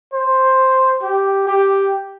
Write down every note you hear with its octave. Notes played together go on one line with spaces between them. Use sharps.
C5
G4
G4